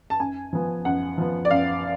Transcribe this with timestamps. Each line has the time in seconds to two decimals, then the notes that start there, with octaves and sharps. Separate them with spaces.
0.10 A5
0.20 F#2 G#5
0.53 F3 B3
0.85 F#2 F#5
1.18 F3 B3
1.45 D5
1.51 F#2 F5